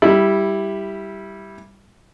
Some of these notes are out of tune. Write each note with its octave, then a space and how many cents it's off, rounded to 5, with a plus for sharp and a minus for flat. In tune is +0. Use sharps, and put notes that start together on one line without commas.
G3 +0 E4 +0